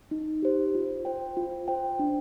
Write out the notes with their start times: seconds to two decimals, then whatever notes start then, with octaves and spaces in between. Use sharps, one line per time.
0.11 D#4
0.43 G4 C5
0.75 F4
1.05 C5 G5
1.37 F4
1.68 C5 G5
1.99 D4